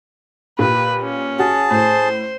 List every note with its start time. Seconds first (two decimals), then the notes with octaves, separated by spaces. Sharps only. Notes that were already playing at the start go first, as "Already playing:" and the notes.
0.59 A#2 G4 B4
1.01 C#4
1.39 F#4 G#4 A5
1.71 A2 C5